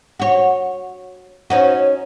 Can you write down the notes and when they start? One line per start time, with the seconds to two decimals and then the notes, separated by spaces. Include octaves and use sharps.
0.20 F#4 C#5
1.50 C#4 D#4 F#4